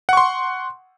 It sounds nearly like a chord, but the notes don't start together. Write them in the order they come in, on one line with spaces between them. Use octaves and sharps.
F#5 C#6 C6